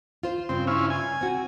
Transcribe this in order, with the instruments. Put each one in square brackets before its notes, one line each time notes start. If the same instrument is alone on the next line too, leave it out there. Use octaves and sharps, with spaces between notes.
[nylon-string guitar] F4 C5
[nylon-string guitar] G2 C#3 [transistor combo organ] C4
[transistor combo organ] C#4 E4 F4
G#5
[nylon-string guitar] C4 F#4